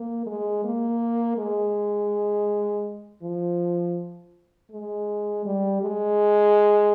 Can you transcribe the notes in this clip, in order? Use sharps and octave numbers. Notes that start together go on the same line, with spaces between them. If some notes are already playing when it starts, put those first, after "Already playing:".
Already playing: A#3
G#3
A#3
G#3
F3
G#3
G3
G#3